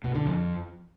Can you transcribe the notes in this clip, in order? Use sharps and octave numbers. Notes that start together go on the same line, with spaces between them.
B2
D3
F2